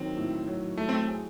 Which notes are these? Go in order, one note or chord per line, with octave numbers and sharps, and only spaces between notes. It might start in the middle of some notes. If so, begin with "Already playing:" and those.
Already playing: D#3 F#3 C4
A2
F#3
A3 E4
C4
A3
G#4